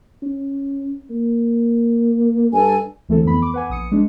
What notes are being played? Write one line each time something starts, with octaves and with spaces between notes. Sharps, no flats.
C#4
A#3
G2 A4 G#5
D2 E3 A3 C4 A4
F2 E3 B3 B5
D6
B4 F#5 G#5
A#1 D#6 C#7
G#3 D4